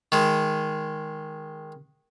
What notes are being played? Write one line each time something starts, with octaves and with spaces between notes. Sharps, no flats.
D#3 G#3